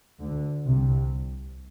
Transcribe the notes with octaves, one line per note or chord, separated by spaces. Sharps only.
D2 D3
C2 C3